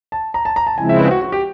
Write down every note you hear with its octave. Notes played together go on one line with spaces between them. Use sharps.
A5
A#5
A5
A#5
A5
C#3 F3 G#3 C4 E4 G#5
E5
B4
F#4
F#4
G4